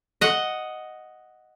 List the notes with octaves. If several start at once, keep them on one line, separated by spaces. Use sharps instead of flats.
D#5 F#5